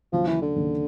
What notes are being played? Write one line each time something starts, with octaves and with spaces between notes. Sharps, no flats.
D#2 C#3 F3 F#3
E3
D3
D#2 C#3 F#3